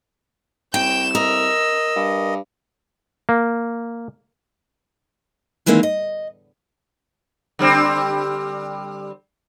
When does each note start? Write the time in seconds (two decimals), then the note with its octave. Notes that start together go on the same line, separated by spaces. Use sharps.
0.74 C2 G5 G6 E7
1.15 A#4 D#5 E6
1.96 G2
3.29 A#3
5.66 D#3 E3 G#3 A#3 C4 F5
5.83 D#5
7.59 D3 G3 C4